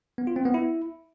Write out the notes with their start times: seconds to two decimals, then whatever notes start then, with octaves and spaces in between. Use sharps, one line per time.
0.18 B3
0.27 F4
0.36 C4
0.45 B3
0.54 E4